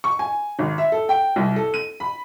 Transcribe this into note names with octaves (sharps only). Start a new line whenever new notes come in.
C#6
G#5
G#1
E5
A4
G5
C2
A4
D#7
B5